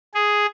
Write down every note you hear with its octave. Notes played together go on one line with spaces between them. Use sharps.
G#4